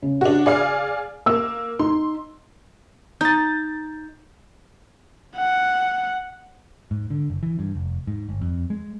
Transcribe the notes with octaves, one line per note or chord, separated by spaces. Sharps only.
C#3
D4 F#4
G#4 D5 F5
A#3 E6
D#4 C6
D#4 G6 A6
F#5
G#2
D3
F#1
E3
G2
F1
G#2
G1
F2
G#3